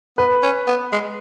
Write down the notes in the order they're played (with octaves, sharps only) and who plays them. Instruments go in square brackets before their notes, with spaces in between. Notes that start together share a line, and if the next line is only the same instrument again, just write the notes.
[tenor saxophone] B3 [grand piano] B4
[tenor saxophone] C#4
B3
G#3